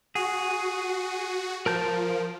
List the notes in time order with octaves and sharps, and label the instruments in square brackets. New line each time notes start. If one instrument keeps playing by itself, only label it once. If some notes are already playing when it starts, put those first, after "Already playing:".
[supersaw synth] F#4 [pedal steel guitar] G#4
[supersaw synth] F3 [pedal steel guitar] A#4 A5 G6